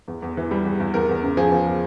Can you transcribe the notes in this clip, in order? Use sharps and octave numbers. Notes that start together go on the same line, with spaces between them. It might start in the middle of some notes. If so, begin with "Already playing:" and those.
E2
E2
E3
G3
E2
E2
E2 A#4
E2
C#3
F3 G#4
E2